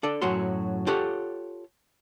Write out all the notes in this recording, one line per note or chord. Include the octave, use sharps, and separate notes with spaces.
D4 A4 D5
F#2 A2 F#3 F#4 C6
F4 G4 A4 C#5 F#5